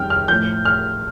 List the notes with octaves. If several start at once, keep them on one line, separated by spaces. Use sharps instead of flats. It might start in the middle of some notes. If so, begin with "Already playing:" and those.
Already playing: F2 D#3 G3 G5 F6
F6
A2 F3 G6
F6